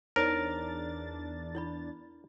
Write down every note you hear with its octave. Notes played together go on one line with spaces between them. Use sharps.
E2 D4 D#4 A#4 C5 C#5 A6
E4 D5 B5